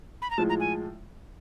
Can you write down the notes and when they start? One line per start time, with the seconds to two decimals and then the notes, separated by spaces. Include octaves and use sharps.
0.22 B5
0.31 A#5
0.38 A2 F3 G#3 A5
0.49 A#5
0.60 G#5